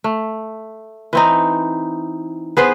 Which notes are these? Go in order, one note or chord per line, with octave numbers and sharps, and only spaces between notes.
A3
E3 C4 D#4
B3 G#4 B4 C5